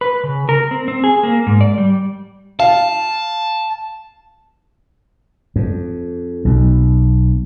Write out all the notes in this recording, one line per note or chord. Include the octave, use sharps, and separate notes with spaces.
B4
C#3
A#4
C4
C4
G#4
A#3
G#2
D5
G3
F5 A5
F2
B1